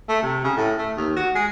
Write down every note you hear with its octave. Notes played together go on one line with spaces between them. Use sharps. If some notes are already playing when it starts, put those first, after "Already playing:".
A3
C3
C#3
A2
A3
D#2
F#4
G#3